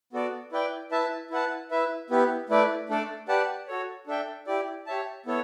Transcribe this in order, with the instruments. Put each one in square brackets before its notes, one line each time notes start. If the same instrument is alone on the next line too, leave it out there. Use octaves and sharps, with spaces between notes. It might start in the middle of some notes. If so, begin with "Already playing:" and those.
[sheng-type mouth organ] B3 F#4 A4 D5
E4 B4 D5 G5
E4 B4 E5 A5
E4 B4 F#5 A5
E4 B4 E5
B3 E4 G4 B4
A3 E4 B4 D5
A3 D4 A4 D5
G4 B4 D5 F#5 A5
F#4 A4 C#5
D4 A4 E5 G5
E4 G4 D5
G4 C#5 E5 A5
B3 E4 A4 C#5